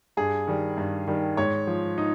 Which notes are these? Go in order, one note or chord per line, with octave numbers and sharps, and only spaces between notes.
G2 G#4
D#3 G3
G2
D#3 G3
G#2 C#5
F3
D#4